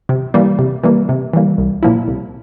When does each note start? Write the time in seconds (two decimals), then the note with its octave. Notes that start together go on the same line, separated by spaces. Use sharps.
0.09 C3
0.34 E3 G3 A#3
0.59 C3
0.83 E3 G3 A#3
1.09 C3
1.33 E3 G3 A#3
1.58 C2
1.83 A#2 F3 A#3 E4
2.08 C2